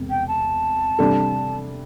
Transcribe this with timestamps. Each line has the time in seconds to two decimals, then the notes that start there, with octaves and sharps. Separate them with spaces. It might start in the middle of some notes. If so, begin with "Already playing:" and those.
Already playing: E1 C3 C4
0.10 G5
0.28 A5
0.99 C3 G3 D4 A4